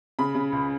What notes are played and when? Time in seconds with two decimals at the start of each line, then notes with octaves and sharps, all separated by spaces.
0.19 C#3 B5
0.35 C#3
0.52 C#2